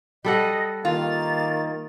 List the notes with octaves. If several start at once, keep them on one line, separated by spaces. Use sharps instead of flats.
G3 A4 D#5 F#5
D#3 A#3 F4 A6